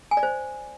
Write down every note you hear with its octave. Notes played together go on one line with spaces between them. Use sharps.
G#5
D5
C5